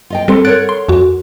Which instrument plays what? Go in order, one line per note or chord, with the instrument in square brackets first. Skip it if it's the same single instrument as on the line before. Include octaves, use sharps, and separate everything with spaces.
[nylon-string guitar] F4 D#5 G5
[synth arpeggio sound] G3 C4 C6 [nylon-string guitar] A4
[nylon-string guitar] A#4 C#5 F#5 [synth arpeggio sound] F#6 A6 D7
[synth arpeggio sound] C6
F2 F#4